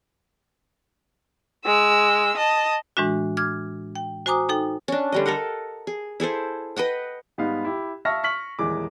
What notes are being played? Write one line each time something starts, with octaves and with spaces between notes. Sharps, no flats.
G#3 E6
D#5 A5
A2 E3 G#3 D4 F#4
D6 F6 G#6
G5
F#4 C5 G#5 A#5 D6 D#6
D#4 A4 G5
C#4 D4
D3 G3 D#5
A4 A#4 D#5 F#5
G#4
E4 G#4 A4 C5
B4 D#5 F#5 G5
G#2 G3 B3 D#4 F5
E4 G4
E5 F5 A5 C#6 F6 A#6
C#6 F6 B6 F#7
D#1 E2 G#3 D6